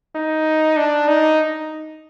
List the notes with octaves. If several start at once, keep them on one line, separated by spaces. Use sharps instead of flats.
D#4
D4
D#4